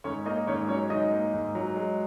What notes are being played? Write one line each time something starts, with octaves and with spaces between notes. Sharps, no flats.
G#2 C#4 C#5
A#3 D#4 D#5
G#2 C#4 C#5
F#3 C#4 C#5
G#2 D#4 D#5
A#3
G#2
F#3
G#3